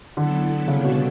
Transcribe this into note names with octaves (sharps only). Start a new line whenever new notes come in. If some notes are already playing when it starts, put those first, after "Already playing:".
D3 F#3 B3 E4 A4
C#3 G3 B3 D4 A4 C#5
B2